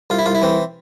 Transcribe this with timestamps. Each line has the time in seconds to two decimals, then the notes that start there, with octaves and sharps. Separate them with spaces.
0.10 C2 F4
0.19 E4
0.26 C2 F4
0.35 E4
0.42 E3 C4